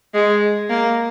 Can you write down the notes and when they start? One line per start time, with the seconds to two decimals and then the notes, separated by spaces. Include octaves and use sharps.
0.14 G#3
0.70 A#3